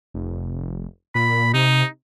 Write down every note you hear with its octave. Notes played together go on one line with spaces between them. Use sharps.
F1
A#2 B5
C3 D#4